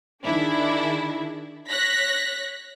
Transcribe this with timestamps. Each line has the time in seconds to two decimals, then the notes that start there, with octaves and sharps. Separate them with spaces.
0.25 D#3 D4 E4 G#4
1.69 C#5 F#6 A#6 B6